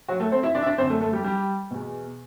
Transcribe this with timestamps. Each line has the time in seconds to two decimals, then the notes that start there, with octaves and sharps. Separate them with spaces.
0.08 F#3 F#4
0.20 A3 A4
0.32 C4 C5
0.43 E4 E5
0.55 D4 D5
0.62 E5
0.66 D4 D5
0.78 F#2 C4 C5
0.81 D3
0.90 A3 A4
1.01 A3 A4
1.13 G3 G4
1.24 G3 G4
1.71 E2 B2